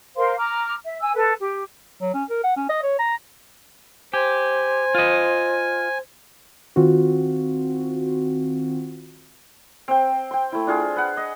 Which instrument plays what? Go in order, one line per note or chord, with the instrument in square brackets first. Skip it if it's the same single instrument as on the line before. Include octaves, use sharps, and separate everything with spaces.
[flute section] A#4 C5 F5 C6
A#5 D6 F6
E5
G#5 E6
A4 B4
G4
[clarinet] F#3
C#4
A#4
F#5
C#4
D#5
C#5
A#5
[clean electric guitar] G4 [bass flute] C5 [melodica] G#5
[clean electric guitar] F4 D#5
[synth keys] D#3 C4 F4 F#4
[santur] C4 G5
G5 C6
A3 E4
D4 F4 G#4
B4 F#5
D#5